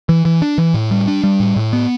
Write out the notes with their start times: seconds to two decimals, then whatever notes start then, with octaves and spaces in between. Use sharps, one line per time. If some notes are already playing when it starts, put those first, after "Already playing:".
0.09 E3
0.25 E3
0.42 D4
0.58 E3
0.74 A2
0.91 G3
1.07 D4
1.24 G3
1.40 A2
1.56 A2
1.73 B3